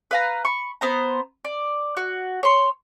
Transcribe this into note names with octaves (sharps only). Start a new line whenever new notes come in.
B4 F5 A#5
B5 C#6
B3 C5 A#5
D5
F#4
C#5 C6